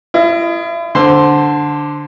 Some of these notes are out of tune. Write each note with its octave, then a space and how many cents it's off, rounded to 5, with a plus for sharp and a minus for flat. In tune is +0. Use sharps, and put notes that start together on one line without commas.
E4 +40 D#5 +0
D3 +0 C5 +0 C6 +0